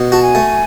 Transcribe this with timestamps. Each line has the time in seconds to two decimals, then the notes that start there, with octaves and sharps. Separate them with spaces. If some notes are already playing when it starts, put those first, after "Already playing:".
Already playing: B2
0.12 F#4 A5
0.23 G#5
0.35 A3